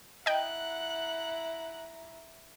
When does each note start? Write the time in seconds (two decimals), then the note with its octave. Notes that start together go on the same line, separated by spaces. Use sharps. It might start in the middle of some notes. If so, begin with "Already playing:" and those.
0.26 E4 D#5 F#5 G5 A#5 F#6